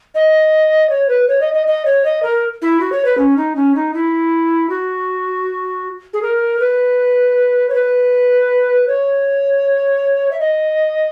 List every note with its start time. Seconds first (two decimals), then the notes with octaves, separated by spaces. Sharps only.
0.15 D#5
0.90 C#5
1.09 B4
1.28 C#5
1.41 D#5
1.54 D#5
1.67 D#5
1.85 C#5
2.05 D#5
2.23 A#4
2.62 E4
2.80 F#4
2.92 C#5
3.05 B4
3.18 C#4
3.37 D#4
3.56 C#4
3.75 D#4
3.94 E4
4.69 F#4
6.13 G#4
6.22 A#4
6.60 B4
7.70 C#5
7.74 B4
8.88 C#5
10.31 E5
10.40 D#5